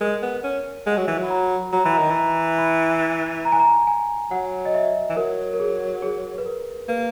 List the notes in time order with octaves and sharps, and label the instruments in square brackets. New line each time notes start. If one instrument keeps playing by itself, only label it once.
[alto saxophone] G#3 [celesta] A#4
[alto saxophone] B3
C#4
[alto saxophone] G#3 [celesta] F#5
[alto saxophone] F#3
E3
[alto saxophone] F#3 [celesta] B5
[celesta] A#5
[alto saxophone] F#3 [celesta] A#5
[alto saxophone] E3 [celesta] B5
[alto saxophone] D#3 [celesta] A#5
[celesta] B5
[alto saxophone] E3
[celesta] A#5
B5
A#5
G#5
A#5
G#5
[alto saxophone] F#3 [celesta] F#5
[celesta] D#5
E5
[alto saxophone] E3
[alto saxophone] F#3 [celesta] A#4
[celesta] A#4
G#4
G#4
B4
A#4
[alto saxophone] A#3 [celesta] B4